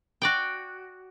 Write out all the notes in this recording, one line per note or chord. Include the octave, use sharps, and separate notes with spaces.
F#4 D5 G5